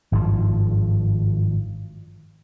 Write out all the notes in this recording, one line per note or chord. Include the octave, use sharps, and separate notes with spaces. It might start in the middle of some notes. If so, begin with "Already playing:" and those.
G#1 G2 D#3 F3